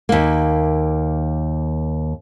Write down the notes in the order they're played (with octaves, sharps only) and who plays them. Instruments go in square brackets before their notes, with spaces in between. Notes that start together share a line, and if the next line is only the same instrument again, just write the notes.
[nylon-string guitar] D#2 A#3